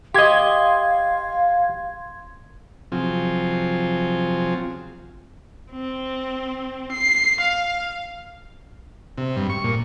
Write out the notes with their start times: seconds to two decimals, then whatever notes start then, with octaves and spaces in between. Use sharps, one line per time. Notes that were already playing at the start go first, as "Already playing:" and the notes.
0.14 G4 D#5 F5 C6 G#6
2.92 C3 F3 F#3 C4 F4 G#4
5.72 C4
6.92 C7
7.41 F5
9.18 C3
9.37 G2
9.50 C#6
9.64 A#2